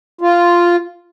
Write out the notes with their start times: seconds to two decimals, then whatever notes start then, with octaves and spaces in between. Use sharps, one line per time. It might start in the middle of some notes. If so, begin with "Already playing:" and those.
0.21 F4